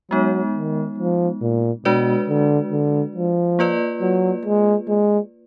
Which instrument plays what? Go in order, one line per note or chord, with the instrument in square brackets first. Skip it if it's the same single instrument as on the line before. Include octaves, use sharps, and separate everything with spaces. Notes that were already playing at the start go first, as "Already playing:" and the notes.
[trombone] F#3 [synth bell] G#3 B3 D#4
[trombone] D#3
F3
A#2
[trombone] B2 [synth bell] G#3 D4 F#4 B4 D5
[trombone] D3
D3
F3
[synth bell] A#3 F4 B4 D5
[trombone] F#3
G#3
G#3